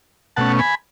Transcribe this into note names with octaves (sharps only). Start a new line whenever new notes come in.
B2 A3 C#4 F#5 A5
G#5 B5